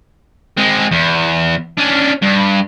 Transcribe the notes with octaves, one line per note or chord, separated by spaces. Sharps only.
G#3 C4
E2
C#4 D4
G2